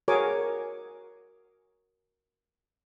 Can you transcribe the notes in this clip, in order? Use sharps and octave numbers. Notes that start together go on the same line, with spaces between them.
F#4 G#4 A#4 C#5 G#5 D6